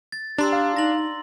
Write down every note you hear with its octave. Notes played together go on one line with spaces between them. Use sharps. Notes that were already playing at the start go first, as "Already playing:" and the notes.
A6
D4 G4 A#5 C6 E6
F5
D#4 A#6 F#7